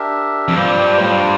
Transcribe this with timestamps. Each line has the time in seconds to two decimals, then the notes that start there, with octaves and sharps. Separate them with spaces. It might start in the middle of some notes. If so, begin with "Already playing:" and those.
Already playing: D4 G4 A#4 E5
0.48 F2
0.55 G2 G3 A#3 F4 C5
1.01 A2
1.12 G2